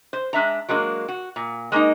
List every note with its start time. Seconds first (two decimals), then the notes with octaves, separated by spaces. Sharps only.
0.13 C5
0.33 G#3 D4 E5 A#5
0.68 F#3 G#3 A#3 D4
1.08 F#4
1.36 A#2
1.72 G#3 A#3 C#4 D#4